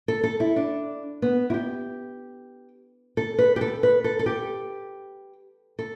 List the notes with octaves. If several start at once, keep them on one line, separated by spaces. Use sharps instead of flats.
A4
A4
E4
D4
B3
E4
G4
A4
B4
G4
A4
B4
A4
A4
G4
A4